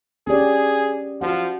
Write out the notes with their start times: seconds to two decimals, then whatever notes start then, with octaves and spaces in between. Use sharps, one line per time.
0.27 C#4 G4 G#4 D5
1.21 F3 F#4 F#5